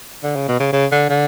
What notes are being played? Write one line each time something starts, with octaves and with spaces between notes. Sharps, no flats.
D3
C#3
B2
C#3
C#3
D3
D3